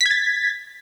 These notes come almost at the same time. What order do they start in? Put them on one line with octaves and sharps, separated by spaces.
B6 G#6 A6